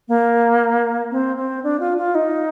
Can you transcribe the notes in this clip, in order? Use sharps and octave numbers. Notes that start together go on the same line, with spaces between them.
A#3
C4
C4
D4
F4
F4
D#4